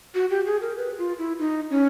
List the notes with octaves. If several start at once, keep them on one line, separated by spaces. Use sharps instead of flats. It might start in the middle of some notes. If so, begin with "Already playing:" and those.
F#4
G4
G#4
A#4
B4
F4
E4
D#4
C#4